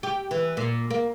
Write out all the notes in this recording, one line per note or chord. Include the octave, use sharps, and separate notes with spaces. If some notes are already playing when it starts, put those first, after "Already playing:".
G4
E3
A#2
A#3